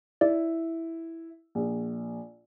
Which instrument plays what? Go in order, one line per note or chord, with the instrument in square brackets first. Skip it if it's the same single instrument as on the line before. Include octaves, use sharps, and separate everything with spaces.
[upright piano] E4 [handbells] D5
[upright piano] A#1